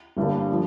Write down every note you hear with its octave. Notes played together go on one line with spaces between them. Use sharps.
G1 G2 D3 G3 A#3
F3